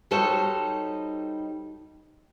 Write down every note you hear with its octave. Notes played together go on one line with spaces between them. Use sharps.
G3 D#4 F#4 A4 C5 C#5